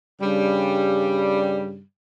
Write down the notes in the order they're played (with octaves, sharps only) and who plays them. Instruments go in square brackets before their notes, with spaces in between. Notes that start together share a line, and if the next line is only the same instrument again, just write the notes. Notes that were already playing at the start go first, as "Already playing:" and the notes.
[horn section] G2 C#3 G3